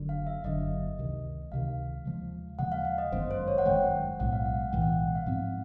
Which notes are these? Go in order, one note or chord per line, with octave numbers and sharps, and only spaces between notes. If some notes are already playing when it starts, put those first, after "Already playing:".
Already playing: F#1 F#2 D3
F5
E5
F#1 F#2 D3 D#5
C#2 C3 D#3
C#2 C3 D#3 F5
D#2 C#3 F3 G#3
D#2 C#3 F3 G#3 F#5
F5
F5
D#5
G1 F#2 D#3 G#3 C5
C5
C#5
F#5
G1 F#2 D#3 G#3 G5
B1 A2 E3 G#3 F#5
F5
F#5
F#5
B1 A2 E3 G#3 G5
F#5
F5
G#2 F3 G#3 C4 F#5